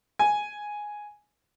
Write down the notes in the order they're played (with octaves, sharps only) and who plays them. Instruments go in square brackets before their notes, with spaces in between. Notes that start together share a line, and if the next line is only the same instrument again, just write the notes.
[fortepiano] G#5